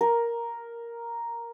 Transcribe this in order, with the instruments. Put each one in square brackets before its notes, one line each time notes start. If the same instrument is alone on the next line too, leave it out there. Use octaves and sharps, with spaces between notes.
[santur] A#4